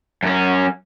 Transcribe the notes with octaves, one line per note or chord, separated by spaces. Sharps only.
F#2 C#4